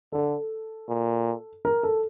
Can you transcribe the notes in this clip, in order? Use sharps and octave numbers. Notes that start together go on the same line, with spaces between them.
D3 A4
A#2
A#4
A4